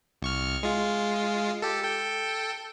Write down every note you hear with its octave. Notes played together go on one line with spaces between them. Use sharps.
C2 C#6 F6
G#3 F4
G4 A4
A4 G5